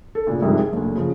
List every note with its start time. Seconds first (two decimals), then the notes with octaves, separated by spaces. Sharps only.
0.15 A4
0.27 D2 A#2 C#3
0.42 C2 F2 G#2 C3
0.59 G#4
0.73 F#1 D2
0.95 C#3 F3